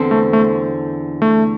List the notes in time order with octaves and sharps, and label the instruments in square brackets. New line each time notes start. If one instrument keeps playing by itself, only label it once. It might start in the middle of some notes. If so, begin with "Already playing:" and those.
Already playing: [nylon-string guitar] E2 D3 C4 A4 C5
[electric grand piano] A3
A3
A3